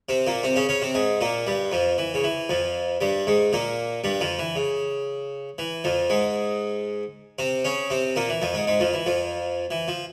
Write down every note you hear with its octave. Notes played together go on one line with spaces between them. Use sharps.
C3 C4
A#2 A#3
C3 C4
C#3 C#4
C#3 C#4
C3 C4
G#2 G#3
A#2 A#3
G2 G3
F2 F3
E3
C#3
E3
F2 F3
G2 G3
G#2 G#3
A#2 A#3
G2 G3
F2 F3
E3
C#3
E3
F2 F3
G#2 G#3
C3 C4
C#3 C#4
C3 C4
A#2 A#3
E3
F2 F3
G#2 G#3
G#2 G#3
F2 F3
E3
F2 F3
E3
F3